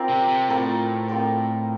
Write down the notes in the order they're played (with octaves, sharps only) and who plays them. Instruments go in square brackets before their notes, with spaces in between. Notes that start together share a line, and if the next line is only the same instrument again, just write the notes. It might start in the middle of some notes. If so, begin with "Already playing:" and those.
Already playing: [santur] C4 F4 A#4 D5
[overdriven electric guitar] C3
C3
[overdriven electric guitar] A2 [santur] C4 F4 A#4 D5
[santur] C4 F4 A#4 D5